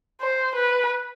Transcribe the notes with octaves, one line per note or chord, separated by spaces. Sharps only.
C5
B4